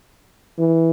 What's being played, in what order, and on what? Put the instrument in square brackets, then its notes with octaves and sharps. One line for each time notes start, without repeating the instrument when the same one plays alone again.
[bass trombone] E3